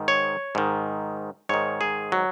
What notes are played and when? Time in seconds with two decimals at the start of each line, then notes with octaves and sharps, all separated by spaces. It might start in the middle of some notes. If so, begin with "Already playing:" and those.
Already playing: G#2 D#3
0.08 C#5
0.55 G#2 D#3
1.49 G#2 D#3 C#5
1.81 G#4
2.12 F#3